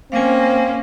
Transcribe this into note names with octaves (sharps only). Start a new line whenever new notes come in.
A#3 C4 C#4 F5 G#5